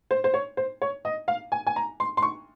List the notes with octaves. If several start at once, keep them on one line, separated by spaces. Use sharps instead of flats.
C5
C5
C#5
C5
C#5
D#5
F5
G#5
G#5
A#5
C6
C6
C#6